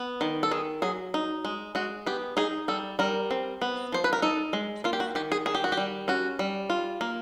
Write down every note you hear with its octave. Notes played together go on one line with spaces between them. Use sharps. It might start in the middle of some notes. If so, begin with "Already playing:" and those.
Already playing: B3
D#3
A4
D#3 G#4
F#3 G#4
D#4
G#3
G#3 F#4
B3 G4
D#4 G#4
G3 A4
G3 A#4
C4
B3
F3 C5
B4
A#4
D#4 A4
G#3
A#3 F4
G4
F#4
D#3 G4
G#4
D#3 G#4
G4
F#4
G4
G3
C#4 F#4
G3
F4
A#3